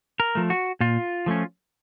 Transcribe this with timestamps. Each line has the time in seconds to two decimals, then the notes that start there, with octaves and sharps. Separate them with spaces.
0.20 A#4
0.35 F3 A3
0.50 F#4
0.80 A#2 F4
1.26 F3 A3 C#4